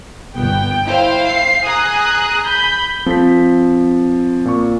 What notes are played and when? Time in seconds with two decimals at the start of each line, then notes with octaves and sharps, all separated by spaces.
0.36 G1 B3 G5
0.86 E4 C5 F5
1.27 C7
1.63 G#4 G#5 A#5 D#6 F#6
2.46 B5 G6
3.06 F3 C4 A4 B6
4.45 A#2 C#6